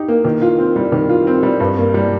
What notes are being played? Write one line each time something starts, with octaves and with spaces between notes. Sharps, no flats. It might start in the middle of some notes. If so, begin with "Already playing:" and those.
Already playing: D#4 G4
A#3
D#3
F4
C4
G3
D#3
F4
C4
G3
G2
A#3
G3